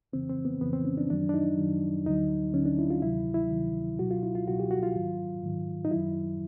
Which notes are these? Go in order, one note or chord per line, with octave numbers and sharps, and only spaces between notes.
F2 C#3 E3 C4
C4
B3
F2 C#3 E3 B3
C4
C#4
D4
F#2 D#3 F#3 D4
D4
D#4
F#2 D#3 F#3
D2 D3 F#3 D#4
D2 D3 F#3 C#4
D4
E4
F4
D2 C3 D#3 F#3 E4
E4
D2 C3 D#3 F#3
C#2 B2 F#3 F#4
F4
E4
F4
C#2 B2 F#3 F#4
G4
F#4
F4
G#2 D#3 F#3
G#2 D#3 F#3
D#4
F#2 D#3 F#3 E4